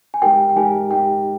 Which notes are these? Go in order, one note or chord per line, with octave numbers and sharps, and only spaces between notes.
G#5
G#3 D#4 G4 A#4 G5
G5
G#3 D#4 G4 A#4 G#5
G#3 D#4 G4 A#4 G5